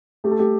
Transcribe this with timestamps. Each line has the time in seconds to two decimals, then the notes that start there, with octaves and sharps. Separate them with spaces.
0.24 A3 G4
0.31 A4
0.39 A3 G4